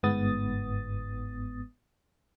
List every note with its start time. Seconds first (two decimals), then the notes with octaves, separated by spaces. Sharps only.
0.03 G1 G#2 B3 D#6 A6